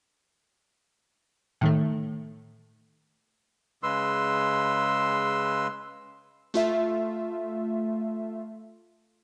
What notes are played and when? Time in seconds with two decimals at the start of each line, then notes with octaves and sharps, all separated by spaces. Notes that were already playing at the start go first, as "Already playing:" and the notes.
1.61 A2 D#3 A3
3.83 C#3 G#3 B4 C6 E6
6.54 A3 F4 E5